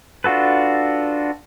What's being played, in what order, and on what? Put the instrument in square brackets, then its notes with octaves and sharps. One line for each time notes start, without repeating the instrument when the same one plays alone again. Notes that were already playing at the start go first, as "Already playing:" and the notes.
[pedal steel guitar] D4 F4 F#4 A4 B4